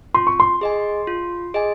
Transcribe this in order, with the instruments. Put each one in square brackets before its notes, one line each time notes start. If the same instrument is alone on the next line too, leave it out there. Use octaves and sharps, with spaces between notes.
[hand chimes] F4 [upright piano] C6
[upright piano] C#6
C6
[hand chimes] G#4 D#5 G#5
F4
G#4 D#5 G#5